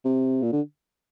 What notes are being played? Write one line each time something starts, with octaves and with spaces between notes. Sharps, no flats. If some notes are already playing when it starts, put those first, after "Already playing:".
C3
A#2
D3